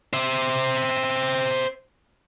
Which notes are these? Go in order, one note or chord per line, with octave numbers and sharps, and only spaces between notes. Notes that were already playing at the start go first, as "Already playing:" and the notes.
C5 E5